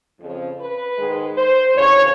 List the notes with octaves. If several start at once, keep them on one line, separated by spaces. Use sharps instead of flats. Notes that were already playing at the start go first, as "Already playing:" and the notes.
F2 C#3 F3
B4
G#2 D#3 G#3
C5
D2 C#3 E3 C#5